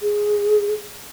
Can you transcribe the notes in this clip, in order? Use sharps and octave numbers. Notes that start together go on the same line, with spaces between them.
G#4